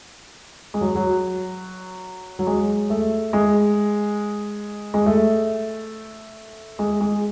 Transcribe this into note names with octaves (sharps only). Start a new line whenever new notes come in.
G#3
F#3
F#3
F#3
G#3
A3
G#3
G#3
A3
G#3
G#3